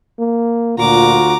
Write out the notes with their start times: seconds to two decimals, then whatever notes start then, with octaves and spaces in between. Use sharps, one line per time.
0.19 A#3
0.78 D2 A#2 F4 F#4 A#5 D6